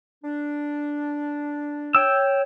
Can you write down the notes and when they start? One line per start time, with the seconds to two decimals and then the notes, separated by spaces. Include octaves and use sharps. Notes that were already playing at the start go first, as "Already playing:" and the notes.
0.24 D4
1.95 C#5 G5 E6